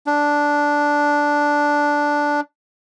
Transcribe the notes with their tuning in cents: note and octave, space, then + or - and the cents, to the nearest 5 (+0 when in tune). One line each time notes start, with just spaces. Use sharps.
D4 -5